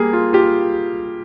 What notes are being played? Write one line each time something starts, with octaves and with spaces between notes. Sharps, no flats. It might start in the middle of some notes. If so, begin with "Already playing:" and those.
Already playing: G3 A#3 G#4
F4
F4 G4